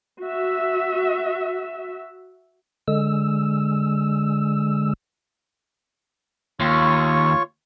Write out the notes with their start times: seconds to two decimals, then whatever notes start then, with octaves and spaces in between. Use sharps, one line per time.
0.20 F#4 E5
2.88 D3 G#3 E6
6.60 D#2 F4 C#5 C#6